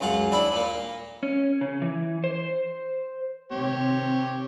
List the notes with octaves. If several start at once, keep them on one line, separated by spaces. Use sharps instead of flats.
C#2 F#2 F4 F#5
D#2 D4 E4 B5
A#2 A#3
C#4
C#3
E3
C5
C3 D#3 C4 G4 C#5